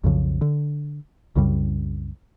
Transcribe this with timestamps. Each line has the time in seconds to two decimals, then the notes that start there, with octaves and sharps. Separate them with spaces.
0.04 B1 F2 C#3 F3
0.41 D3
1.36 C2 F#2 C#3 G3